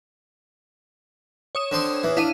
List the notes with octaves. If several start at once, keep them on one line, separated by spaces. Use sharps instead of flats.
C#5 D#6 E7
D3 C4 C6
E2 E3
D4 E4 F5 D#7